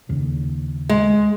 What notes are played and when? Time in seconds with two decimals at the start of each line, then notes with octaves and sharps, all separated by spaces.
0.09 D#2 C#3
0.89 G#3